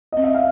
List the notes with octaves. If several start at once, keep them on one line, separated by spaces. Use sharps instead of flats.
C4 D#5
E5
F5